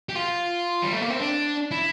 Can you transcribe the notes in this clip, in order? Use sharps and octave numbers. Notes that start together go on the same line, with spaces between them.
G4
F4
G3
A3
A#3
C4
D4
E4